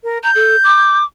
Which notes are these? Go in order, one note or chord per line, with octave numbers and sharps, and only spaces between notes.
A#4
A#5 G6
A4
D6